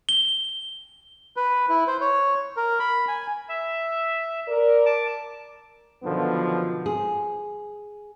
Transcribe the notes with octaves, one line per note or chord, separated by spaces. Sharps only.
G7
B4
E4
C5
C#5
A#4
B5
G#5
E5
A#4 D5
A5 D6
F#2 B2 D3 D#3 F3 B3
G#4